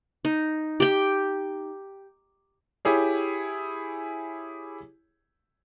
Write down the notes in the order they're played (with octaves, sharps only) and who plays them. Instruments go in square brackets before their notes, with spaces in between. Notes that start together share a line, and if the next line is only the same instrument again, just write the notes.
[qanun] D#4
G4 G5
[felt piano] E4 G4 G#4 C#5